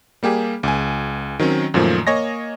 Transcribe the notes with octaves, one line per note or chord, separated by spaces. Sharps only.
G3 A#3 G4 G#4
C#2 G#5
D#3 F#3 C4 C#4
F#2 A#2 D#3 F3 A3
A#3 C#5 D#5 G#5 A#6